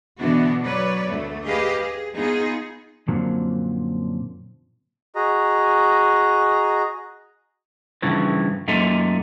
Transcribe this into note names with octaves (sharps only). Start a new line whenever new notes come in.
B2 D3 E3 B3 D4 F#4
F#3 B4 C#5 D5
D2 A3
G4 G#4 B4 D#5 F5
G#4
B3 D#4 F4 G#4
F#2 A#2 D3 F3 F#3 C4
F#4 G#4 D#5 A#5
G2 C#3 E3 F3
F#2 A#2 A3 D#4